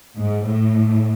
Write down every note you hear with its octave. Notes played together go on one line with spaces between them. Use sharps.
G#2
A2